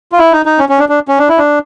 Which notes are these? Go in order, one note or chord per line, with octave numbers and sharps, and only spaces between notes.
F4
E4
D#4
D#4
C#4
C#4
D4
D4
C#4
D4
E4
D4